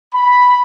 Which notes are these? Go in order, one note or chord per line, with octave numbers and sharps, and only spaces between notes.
B5